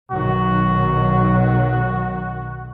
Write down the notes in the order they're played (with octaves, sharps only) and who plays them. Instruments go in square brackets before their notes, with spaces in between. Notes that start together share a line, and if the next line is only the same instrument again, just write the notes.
[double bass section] B1 D#3 F#3 [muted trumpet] F#4